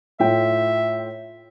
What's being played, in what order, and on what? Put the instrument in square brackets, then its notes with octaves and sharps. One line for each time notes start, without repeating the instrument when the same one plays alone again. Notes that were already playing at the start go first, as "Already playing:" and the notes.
[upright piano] A2 F4 G5 [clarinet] E5